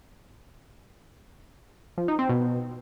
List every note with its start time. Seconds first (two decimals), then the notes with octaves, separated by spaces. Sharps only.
1.98 F3
2.08 D#4
2.19 C4
2.29 B2